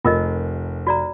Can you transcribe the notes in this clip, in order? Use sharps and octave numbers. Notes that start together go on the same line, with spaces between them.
F1 F4 A#4 D#5
F#4 D5 A#5